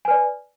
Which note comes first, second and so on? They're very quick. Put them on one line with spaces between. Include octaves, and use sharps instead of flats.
G#5 B4 D5